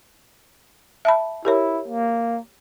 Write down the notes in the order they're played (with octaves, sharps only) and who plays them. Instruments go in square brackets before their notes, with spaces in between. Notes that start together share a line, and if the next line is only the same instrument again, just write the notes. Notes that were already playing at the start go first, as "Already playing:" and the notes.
[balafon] E5 A5 B5
[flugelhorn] E4 [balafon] G4 A#4 C#5
[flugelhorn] A#3